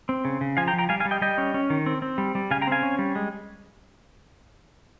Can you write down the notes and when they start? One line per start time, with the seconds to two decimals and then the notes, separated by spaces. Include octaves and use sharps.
0.09 C4
0.25 C#3
0.41 C#3
0.57 F3 F5 G#5
0.68 G5 A#5
0.73 F3
0.78 G5 A#5
0.89 G3 F5 G#5
1.00 F5 G#5
1.05 G3
1.11 D#5 G5
1.21 G3 D#5 G5
1.38 C#4
1.54 C#4
1.70 D#3
1.86 C4
2.02 C4
2.18 G3
2.35 G3
2.51 C#3 F5 G#5
2.62 G5 A#5
2.67 C4 F5 G#5
2.83 C#4
2.99 G3
3.16 G#3